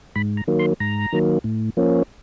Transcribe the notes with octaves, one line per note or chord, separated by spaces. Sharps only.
G#2 B5
A#5
D#3 F#3 A#3
C6
G#2 A#5
D#3 F#3 A#3
A2
F3 A#3 C#4